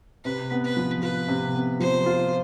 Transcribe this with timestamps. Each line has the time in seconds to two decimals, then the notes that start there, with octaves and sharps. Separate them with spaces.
0.24 C3 B4
0.51 B3
0.64 B4
0.77 F3
1.02 F4 B4
1.28 C3
1.54 B3
1.80 F3 C5
2.06 F4